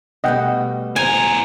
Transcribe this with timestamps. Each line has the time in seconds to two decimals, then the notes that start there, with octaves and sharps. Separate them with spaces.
0.24 B2 G3 A3 D#5 F#5 G5
0.96 E2 G#5 A#5